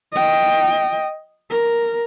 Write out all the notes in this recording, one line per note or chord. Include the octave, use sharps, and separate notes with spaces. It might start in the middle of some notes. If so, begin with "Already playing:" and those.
D#5 G5
A#4